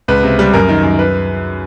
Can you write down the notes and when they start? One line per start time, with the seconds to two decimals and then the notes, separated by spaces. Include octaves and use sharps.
0.08 C#2 B4
0.23 C3
0.39 G3
0.53 F#2 A#4
0.69 D#3
0.83 F#2
0.99 B4